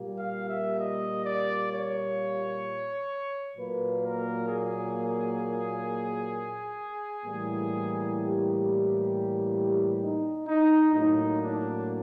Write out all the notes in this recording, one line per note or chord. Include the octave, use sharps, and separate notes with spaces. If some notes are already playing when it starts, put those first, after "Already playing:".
Already playing: A#2 G3 A#3
F5
E5
D#5
D5
C#5
A#2 F#3 A#3 B4
A#4
G#4
A2 E3 G3 A#3
G4
D#4
D#4
A2 F#3 A#3 D#4
D4